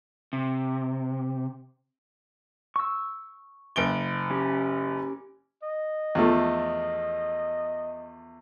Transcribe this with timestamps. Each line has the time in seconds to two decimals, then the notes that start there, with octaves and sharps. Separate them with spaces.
0.33 C3
2.76 C#6 E6
3.76 F#1 D7 G7
4.31 C#4 G4
5.63 D#5
6.15 E2 F3 A3